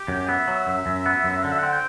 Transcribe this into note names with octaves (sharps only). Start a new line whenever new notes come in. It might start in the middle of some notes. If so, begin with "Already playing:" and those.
Already playing: G4
F#2
B3 E5
F#3
F#2
F#2
B3
F#2
D3 F#5
E5
C4 F#5
G5